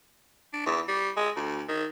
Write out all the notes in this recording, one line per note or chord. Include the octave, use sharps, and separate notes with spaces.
D4
E2
G3
G#3
D2
D#3